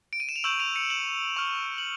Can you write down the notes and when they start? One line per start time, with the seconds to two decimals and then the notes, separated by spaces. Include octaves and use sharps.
0.13 D7
0.20 D#7
0.29 E7
0.36 F7
0.44 C#6 E6 G6 E7 F#7
0.60 D#7 F7
0.75 C#7 D#7
0.90 E7 F#7
1.37 C#6 F6
1.78 F#7